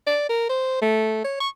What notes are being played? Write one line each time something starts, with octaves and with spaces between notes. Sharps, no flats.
D5
A#4
C5
A3
C#5
C#6